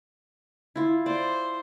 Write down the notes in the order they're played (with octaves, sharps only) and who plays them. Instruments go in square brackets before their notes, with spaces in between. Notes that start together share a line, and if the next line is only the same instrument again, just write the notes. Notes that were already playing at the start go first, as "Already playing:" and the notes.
[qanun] E4 F4
[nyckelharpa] C5 [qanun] D5